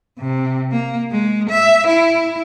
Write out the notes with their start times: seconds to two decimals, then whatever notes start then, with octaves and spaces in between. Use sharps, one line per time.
0.19 C3
0.71 A#3
1.11 G#3
1.50 E5
1.87 E4